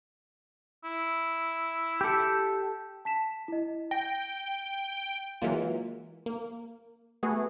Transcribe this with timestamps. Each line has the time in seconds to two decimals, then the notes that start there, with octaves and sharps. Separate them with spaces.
0.84 E4
2.01 G4 A4
3.05 A5 B6 E7
3.48 E4 D#5
3.91 G5 A#6
5.42 E3 F#3 G#3 A#3 F4
6.26 A#3
7.23 A3 B3 F#4 G#4